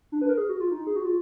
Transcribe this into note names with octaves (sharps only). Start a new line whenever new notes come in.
D4
B4
A#4
G#4
F#4
F4
D#4
G#4
F#4
F4